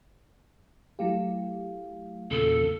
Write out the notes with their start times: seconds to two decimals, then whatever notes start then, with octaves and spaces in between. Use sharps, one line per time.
0.99 F#3 A3 E4 G4 F5
2.31 E2 A#2 C#3 A4